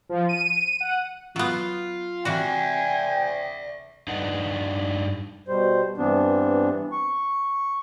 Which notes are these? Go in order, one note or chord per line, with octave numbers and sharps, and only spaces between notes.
F3
D#7
F#5
F#3 B3 F4
C3 E3 F#4 D5 E5 G5 G#5
G2 D4 D#4 B4 F#5
B2 G3 C5
G2 E3 B3 C4 D4
C#6